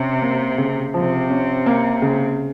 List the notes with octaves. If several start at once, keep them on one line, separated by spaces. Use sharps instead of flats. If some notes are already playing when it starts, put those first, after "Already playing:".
Already playing: C3 C#4
A#3
C#3
C3 F3
C#4
A#3
C#3